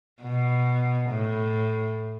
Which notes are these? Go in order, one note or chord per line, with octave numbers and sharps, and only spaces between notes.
B2
A2